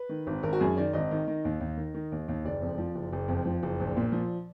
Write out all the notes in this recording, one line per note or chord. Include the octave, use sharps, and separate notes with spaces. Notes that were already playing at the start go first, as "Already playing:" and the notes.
Already playing: B4
D#3
G#1
G#1 A#4
F#4
F#2 G#4
D#3 D5
G#1 D#5
D#3
D#3
D#2
D#2
D#3
D#3
D#2
D#2
F#1 D5
F2
F3
F#1
F#1
F2
F3
F#1
A#1
A#2
F3